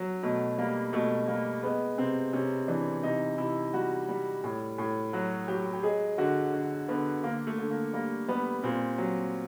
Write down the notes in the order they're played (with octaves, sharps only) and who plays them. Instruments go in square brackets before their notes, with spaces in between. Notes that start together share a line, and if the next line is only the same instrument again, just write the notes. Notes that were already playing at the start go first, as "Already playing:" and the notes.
Already playing: [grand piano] F#3
B2 A3
G3 A#3
B2 A3
G3 A#3
G#3 B3
C3 C4
C3 C#4
E3 D4
C3 D#4
C3 E4
G3 F#4
G3
A2
A2
F#3 F#4
F#3 G4
G4
G#3 G#4
D3 F#4
D3
D3 B3
D3 A#3
A3
D3
A#3
G3 A#3
G3 B3
A#2 C4
F#3 C4